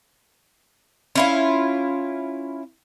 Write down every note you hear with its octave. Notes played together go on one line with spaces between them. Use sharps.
C#4 E4 F4